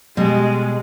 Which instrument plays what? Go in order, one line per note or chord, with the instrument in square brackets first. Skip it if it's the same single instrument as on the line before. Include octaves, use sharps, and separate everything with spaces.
[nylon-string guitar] B2 G3 [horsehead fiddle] G#3